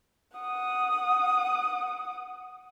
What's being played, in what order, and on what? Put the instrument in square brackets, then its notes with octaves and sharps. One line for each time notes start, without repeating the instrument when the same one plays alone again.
[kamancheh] F#5 D#6